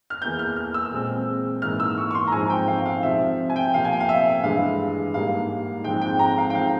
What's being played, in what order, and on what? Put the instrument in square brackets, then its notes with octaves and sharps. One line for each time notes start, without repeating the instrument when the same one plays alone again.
[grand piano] F6
E2 E3 A#3 G6
F6
F6
E6
A#2 G#3 C4
G#2 E3 A#3 F6
E6
C#6
C#6
C6
A#5
G#2 F3 C4 G#5
G5
F5
F5
C3 F3 C4 E5
G#5
G5
C3 F3 A#3 F5
G#5
G5
F5
E5
G2 E3 G#3 F5
G#2 G3 A#3 F5
G#2 F3 G#3 C4 G5
G5
A#5
F5
G5
F3 C4 F5